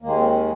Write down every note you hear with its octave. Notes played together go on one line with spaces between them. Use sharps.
D#2 D#3 G#3 A#3
C4